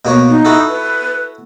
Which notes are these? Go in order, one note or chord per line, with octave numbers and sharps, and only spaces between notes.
B2 A#3 C#5
D#4
E4 F#4 A4
B4